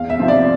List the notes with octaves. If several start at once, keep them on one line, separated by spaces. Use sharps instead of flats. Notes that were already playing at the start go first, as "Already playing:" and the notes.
Already playing: E2 F5
E5
C3 F3 C4
D5